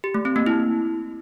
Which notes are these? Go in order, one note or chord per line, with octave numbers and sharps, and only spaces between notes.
G4
A3
C4
A#3
E4